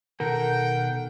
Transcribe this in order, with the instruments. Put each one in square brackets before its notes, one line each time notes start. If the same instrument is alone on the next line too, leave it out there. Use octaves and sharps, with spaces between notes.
[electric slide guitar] B2 D#3 A4 [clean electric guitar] A#4 [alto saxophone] F#5 [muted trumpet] G5